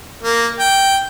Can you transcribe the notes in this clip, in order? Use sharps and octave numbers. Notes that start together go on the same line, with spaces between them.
A#3
G5